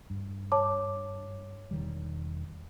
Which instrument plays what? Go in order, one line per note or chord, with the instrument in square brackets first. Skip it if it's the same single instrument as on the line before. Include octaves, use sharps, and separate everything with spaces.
[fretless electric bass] G2
[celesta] C#5 A5 D6
[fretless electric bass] E1 D#3 G3